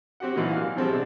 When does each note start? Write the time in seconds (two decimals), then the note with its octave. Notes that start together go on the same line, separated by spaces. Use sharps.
0.20 C4 F#4 G4 F#5
0.35 A#2 E3 F#3 A#3 D#4
0.51 F5
0.76 B2 F3 G3 G#3 C4
0.89 C3 D4